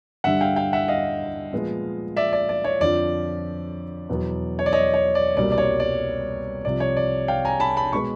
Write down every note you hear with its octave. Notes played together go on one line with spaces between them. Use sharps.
G2 D3 G3 E5 F#5
F5 G5
F5 G5
E5 F#5
D#5 F5
A#2 F3 G#3 B3
D5 E5
D5
D5
C#5
F2 D3 F3 D5
E2 B2 F#3 B3
C#5
D5
C#5 D#5
C#5
D5
C2 B2 G3 A#3 D5
D5
C#5
D5
C2 C3 F3 D5
C#5
D5
F5 G5
G#5 A#5
A5 B5
A5 B5
B2 G#3 B3 B5 C#6